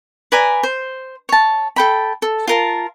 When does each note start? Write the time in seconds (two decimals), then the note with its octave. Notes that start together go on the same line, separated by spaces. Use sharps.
0.32 B4 D5 G#5 A#5
0.63 C5
1.29 C#5 A5
1.76 A4 G5 B5
2.22 A4
2.48 F4 A#4 A5